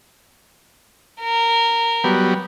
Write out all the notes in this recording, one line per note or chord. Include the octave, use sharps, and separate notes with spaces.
A#4
F#3 G3 B3